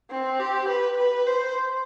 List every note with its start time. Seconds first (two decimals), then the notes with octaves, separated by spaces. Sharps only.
0.10 C4
0.40 G4
0.68 B4
0.97 B4
1.27 C5